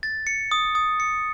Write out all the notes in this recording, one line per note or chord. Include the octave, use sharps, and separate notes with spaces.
A6
C#7
D#6
D#6
C#7